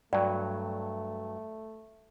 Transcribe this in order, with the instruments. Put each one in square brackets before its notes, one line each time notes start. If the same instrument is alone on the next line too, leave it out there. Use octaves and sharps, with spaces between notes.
[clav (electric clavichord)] G2 F#3 [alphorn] A3 [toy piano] D5 G5